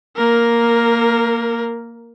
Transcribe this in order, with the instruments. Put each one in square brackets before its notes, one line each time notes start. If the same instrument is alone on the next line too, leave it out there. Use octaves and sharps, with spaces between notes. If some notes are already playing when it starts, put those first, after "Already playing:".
[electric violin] A#3 A#4